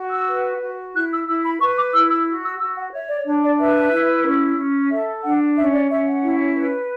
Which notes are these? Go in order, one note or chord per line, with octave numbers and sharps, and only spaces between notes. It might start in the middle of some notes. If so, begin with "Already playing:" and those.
Already playing: F#4
E6
B4
F#4
E4 F#6
E6
E4 E6
B5
B4 C#6
D6
E4 E6
E6
F#4
E6
F#4 E6
F#5
C#5 E5
D5
D4 C#5
D5
B4 E5
E4
C#4
C#4
A4 E5
D4 F#5
C#4 E5
D5
C#4 E5
F#5
E4
B4